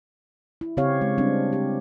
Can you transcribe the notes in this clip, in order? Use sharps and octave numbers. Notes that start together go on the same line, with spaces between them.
E4
C#3 C4 G4 C#5 F5
G#3
G3 C4 D4
G4